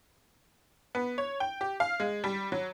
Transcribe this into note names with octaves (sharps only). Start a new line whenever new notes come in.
B3
C#5
G5
G4
F5
G#3
G3
F#3